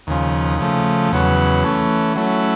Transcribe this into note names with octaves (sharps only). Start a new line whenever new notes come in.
D#2 C#3 F3
C#3 F3 A3
E2 C#3 F#3 B3
E3 A3 C#4
F#3 A3 C#4 E4